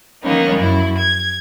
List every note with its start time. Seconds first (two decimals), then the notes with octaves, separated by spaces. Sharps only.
0.22 D#3 F3 A#3 B3 C#4 D#4
0.56 F#2 E4
0.97 G#6